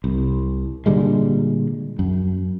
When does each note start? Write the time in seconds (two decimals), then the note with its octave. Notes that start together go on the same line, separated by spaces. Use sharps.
0.04 C2
0.86 A#2 D3 G3 G#3
1.99 F#2